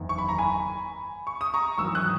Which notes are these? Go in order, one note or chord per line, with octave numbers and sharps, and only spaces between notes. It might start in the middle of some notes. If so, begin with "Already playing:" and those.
Already playing: F#1 E2 D#3
C#6
B5
A#5
G#5 B5
C#6
D#6
A#5 C#6
G#1 F#2 E3 C#6 E6
D#6 F#6